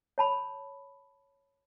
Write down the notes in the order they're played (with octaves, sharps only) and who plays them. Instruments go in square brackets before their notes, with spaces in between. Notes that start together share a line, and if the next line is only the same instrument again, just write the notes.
[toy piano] C#5 A5 B5